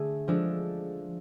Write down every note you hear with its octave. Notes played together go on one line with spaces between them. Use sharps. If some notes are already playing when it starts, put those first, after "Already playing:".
Already playing: D3 A3 D4 G#4
F3 G#3 D4 A4